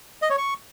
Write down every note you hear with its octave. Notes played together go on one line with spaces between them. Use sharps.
D#5
C#5
C#6